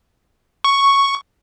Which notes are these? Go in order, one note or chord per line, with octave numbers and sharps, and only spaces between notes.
C#6